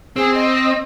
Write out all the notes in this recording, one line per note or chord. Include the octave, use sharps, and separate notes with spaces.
C4 G#4
D#5